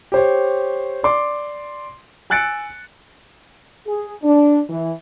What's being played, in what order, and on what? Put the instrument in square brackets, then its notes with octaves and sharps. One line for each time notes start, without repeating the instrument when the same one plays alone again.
[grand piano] G4 C5 C#5
D5 C6 D6
G#5 E6 F#6 A6 C#7 D7
[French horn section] G#4
D4
E3